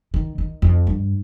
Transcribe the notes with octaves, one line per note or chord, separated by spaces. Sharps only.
D#3
D#3
F2
G2